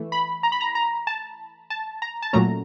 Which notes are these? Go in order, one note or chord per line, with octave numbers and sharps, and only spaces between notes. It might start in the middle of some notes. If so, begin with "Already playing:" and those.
Already playing: E3 A3
B5
A#5
B5
A#5
A#5
A5
A5
A#5
A5
A#2 F#3 A3 C#4 A#5